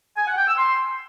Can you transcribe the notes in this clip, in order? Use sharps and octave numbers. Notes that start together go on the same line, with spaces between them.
G#5
F#5
G5
E6
C6